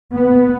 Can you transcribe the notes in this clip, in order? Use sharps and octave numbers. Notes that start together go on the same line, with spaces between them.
B3